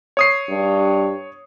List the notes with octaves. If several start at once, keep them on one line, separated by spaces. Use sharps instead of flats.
C#5 D#6 C7
G2